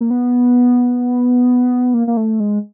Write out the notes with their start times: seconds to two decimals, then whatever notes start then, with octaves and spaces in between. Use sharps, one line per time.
0.01 A#3
0.10 B3
1.94 A#3
2.07 A#3
2.17 A3
2.40 G#3